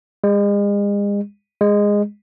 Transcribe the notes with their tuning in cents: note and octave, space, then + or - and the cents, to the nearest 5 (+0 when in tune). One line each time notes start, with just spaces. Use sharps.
G#3 -40
G#3 -15